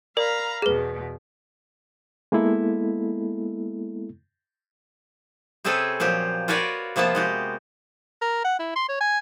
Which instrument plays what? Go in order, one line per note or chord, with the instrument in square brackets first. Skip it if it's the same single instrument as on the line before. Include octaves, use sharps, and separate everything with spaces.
[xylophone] A#4 D5 [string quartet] F5 A#5 B5
[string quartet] E2 B2 [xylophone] G#4 B4
[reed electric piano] G#3 A#3 B3 E4 A4
[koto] C3 C4 C#4 G#4 A4 B4
A#2 F3 F#3 G4
F4 F#4 A#4 B4 C#5 D5
C3 F3 A#3 B3 A5
G#3 F#4 G4
[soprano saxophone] A#4
F#5
E4
C6
C#5
G#5